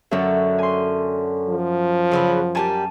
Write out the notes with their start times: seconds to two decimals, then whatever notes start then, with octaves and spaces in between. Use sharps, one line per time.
0.11 F#2 D3 F#3 A4 E5
0.59 G#5 C6
1.49 F3
2.12 C#3 F#3 B4
2.55 G3 A#3 G4 G#5 A5